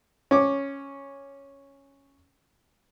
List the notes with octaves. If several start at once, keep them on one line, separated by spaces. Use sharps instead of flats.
C#4 D6